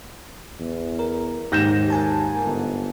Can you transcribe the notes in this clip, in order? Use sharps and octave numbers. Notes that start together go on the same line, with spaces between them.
E2
A#4
D#2 G#2 G4 G6 A#6 E7
A#4 G#5 A5
G1